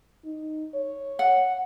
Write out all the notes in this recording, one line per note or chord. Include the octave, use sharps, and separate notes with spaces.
D#4
C#5
F#5